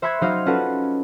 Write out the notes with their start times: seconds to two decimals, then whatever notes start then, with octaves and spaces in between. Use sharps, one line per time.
0.02 C5 E5 B5 C#6 F#6 G#6
0.21 F#3 D#4 C5 F5
0.46 C#4 F4 F#4 A4 B4 F#5